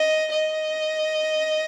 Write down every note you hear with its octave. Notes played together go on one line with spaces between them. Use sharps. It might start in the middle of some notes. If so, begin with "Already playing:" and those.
Already playing: D#5
D#5